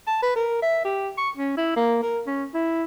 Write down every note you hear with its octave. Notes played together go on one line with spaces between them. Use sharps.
A5
B4
A#4
E5
G4
C#6
C#4
E4
A#3
A#4
C#4
E4